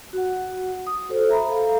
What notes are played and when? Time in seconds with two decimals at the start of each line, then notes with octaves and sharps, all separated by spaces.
0.13 F#4 F#5
0.87 D#6
1.09 F#4 A4 C5
1.29 E5 A#5 B5
1.49 A4 F5 A#5